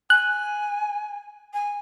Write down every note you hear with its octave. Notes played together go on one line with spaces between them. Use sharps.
G#5 F#6
G#5